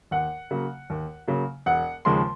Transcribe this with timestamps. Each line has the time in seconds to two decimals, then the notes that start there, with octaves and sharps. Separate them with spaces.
0.11 D#2 F#5
0.51 C#3 F#3 A#3
0.90 D#2
1.27 C#3 F#3 A#3
1.66 E1 F#5
2.05 D#2 C#3 F3 G#3 C6